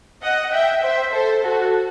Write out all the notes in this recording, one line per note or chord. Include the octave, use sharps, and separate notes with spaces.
D#5 F#5
E5 G5
C5 E5
A4 C5
F#4 A4